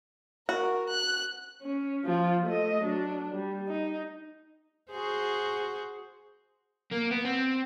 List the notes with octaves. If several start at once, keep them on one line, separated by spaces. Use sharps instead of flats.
F#4 A#4
F#6
C#4
F3 F4
A3 D#5
F#3 D4
G3
D#4
F#4 G#4 C5
A#3
B3
C4